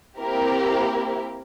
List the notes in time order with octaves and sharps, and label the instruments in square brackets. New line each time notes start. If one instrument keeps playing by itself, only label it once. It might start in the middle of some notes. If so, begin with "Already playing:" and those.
[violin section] A#3 C4 E4 G4 A#4